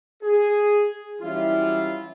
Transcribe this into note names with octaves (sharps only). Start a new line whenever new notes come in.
G#4
E3 F#3 G3 C#4 E4 F4